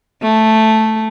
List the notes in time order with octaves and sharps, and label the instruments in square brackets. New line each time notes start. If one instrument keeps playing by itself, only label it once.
[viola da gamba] A3